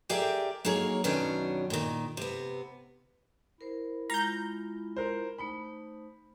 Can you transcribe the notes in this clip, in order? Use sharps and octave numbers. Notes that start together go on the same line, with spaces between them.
G4 G#4 A#4 D5 E5 G5
F#3 A#3 D#4 G#4 A#4 C#5
F#2 B2 D#3 B3 C#4 D4
A#2 D#3
C3 B3
E4 A#4 C5
G#3 F4 A#5 G6
A#4 C5
A3 D#4 C5 B5